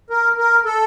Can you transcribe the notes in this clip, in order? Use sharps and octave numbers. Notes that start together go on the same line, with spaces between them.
A#4
A#4
A4